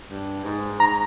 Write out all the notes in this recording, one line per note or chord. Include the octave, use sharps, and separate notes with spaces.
G2
G#2
G#2 A#5